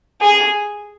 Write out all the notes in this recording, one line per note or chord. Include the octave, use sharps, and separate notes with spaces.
G#4